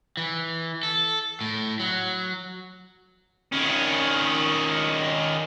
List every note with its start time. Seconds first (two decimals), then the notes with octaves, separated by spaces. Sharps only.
0.17 E3
0.83 A4
1.41 A2
1.80 F#3
3.52 D#3 C#4